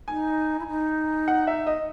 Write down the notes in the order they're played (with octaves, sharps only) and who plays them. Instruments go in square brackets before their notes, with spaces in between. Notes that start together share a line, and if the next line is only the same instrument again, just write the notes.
[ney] D#4 [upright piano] G#5
[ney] E4
D#4
[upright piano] F#5
E5
D#5